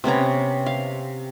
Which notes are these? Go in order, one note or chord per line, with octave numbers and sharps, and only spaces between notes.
C3 B3 C#4 A#5
F5